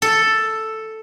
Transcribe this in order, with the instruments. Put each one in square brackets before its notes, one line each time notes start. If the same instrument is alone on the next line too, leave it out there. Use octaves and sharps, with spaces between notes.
[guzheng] A4